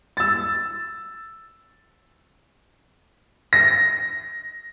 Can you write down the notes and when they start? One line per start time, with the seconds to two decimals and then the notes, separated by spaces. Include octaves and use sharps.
0.17 E6 A6
3.53 A#6